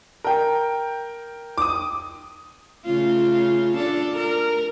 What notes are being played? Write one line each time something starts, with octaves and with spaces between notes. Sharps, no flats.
A#4 G5
D6 D#6
C#3 A3 F4
D4 F4 A4
A#4